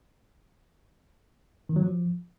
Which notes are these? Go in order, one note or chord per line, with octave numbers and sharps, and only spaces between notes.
D#3
F#3
F3